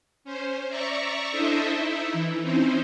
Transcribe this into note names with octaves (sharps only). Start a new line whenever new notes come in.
C#4 C5
D5 E5 A#5 C#6
D4 E4 A4 C5 D#5 E5
D#4 E4 E5
E3
C4 C#4 D#4 E4 C5